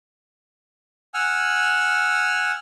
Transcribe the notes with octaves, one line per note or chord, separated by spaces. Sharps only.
F#5 G#5 E6 F6